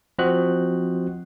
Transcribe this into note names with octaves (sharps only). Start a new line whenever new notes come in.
F3 C4 F#4 C5 D#5 F#6